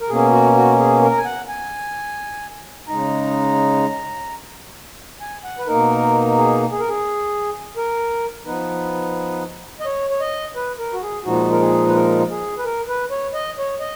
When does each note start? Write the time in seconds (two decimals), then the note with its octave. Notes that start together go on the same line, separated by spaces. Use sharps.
0.01 A#4
0.09 B2 A#3 C#4 G#4
0.32 F#4
0.56 F#4
0.79 G#4
1.03 A#4
1.11 A#5
1.18 G#5
1.25 F#5
1.48 G#5
2.88 C#3 G#3 D#4 A#5
5.21 G#5
5.44 F#5
5.59 B4
5.67 B2 A#3 D#4 A#4
6.38 G#4
6.72 G#4
6.80 A#4
6.89 G#4
7.77 A#4
8.46 F3 B3 D#4 B4
9.80 D#5
9.86 C#5
10.10 C#5
10.21 D#5
10.56 B4
10.79 A#4
10.93 F#4
11.02 G#4
11.25 A#2 F3 G#3 D#4 F#4
11.52 A#4
11.60 G#4
11.88 B4
11.95 A#4
12.30 G#4
12.59 B4
12.65 A#4
12.89 B4
13.11 C#5
13.34 D#5
13.58 C#5
13.80 D#5